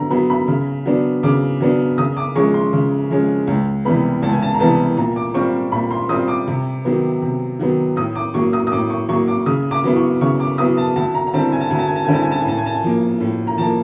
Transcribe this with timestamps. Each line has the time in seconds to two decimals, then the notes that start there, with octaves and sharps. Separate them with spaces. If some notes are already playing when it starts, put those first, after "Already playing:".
Already playing: D3 F#3 B3 A#5
0.10 F#3 B3 B5
0.30 B5
0.48 C#3
0.86 F#3 B3 D4
1.23 C#3 D6
1.60 F#3 B3 D4
1.98 C#3 D#6
2.17 D6
2.35 F3 G#3 C#4 C#6
2.54 C6
2.73 C#3
3.10 F3 G#3 C#4
3.47 C#2
3.85 C3 E3 G3 B3 B5
4.22 C#2 A5
4.32 G#5
4.42 A5
4.54 A#5
4.60 C3 E3 G3 B3 A5
4.97 A#2 A#5
5.16 D6
5.34 G3 C4 F4 C#6
5.72 A#2 B5
5.91 C6
6.09 G3 C4 F4 D#6
6.28 D6
6.47 C3
6.85 D#3 F#3 B3
7.22 C3
7.60 D#3 F#3 B3
7.96 A2 D#6
8.15 D6
8.34 F#3 A#3 C#6
8.53 D#6
8.67 D#6
8.72 A2 D6
8.90 C#6
9.09 F#3 A#3 C#6
9.28 D6
9.46 C#3 D#6
9.71 D6
9.84 F#3 B3 E4
9.96 C#6
10.21 C#3 C#6
10.40 D6
10.58 F#3 B3 E4 D#6
10.77 A5
10.96 D2 A5
11.14 A#5
11.27 A#5
11.33 D3 G3 C4 E4 A5
11.52 G#5
11.60 A5
11.70 D2 G#5
11.79 A5
11.87 G#5
11.96 A5
12.04 D3 G3 C4 E4 G#5
12.14 A5
12.22 G#5
12.31 A5
12.40 G#5
12.45 A2 A5
12.57 G#5
12.66 A5
12.75 G#5
12.83 F3 A#3
13.20 A2
13.47 A#5
13.58 F3 A#3 A5